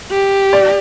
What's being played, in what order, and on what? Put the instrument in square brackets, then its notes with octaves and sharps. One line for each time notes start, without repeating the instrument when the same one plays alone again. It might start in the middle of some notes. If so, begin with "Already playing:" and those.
[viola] G4
[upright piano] D5